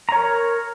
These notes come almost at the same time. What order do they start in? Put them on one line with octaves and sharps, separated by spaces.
A#5 C#5 A#4